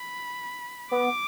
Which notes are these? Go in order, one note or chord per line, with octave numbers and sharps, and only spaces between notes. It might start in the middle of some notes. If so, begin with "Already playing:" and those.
Already playing: B5
B3 D6